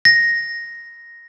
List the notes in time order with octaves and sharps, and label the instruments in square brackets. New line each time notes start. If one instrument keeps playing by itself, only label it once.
[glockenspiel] A#6